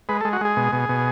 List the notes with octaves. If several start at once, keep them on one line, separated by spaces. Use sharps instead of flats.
G#3 B4
A4
G#3
F#4
G#3 G#4
B2
B2
B2